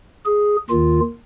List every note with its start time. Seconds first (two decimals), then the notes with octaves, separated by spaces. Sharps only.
0.26 G#4
0.70 D#2 D#3 F4